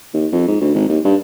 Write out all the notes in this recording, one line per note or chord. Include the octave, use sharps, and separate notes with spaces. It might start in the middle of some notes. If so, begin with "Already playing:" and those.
D#2
F2
G#2
D2
G#1
D#2
G2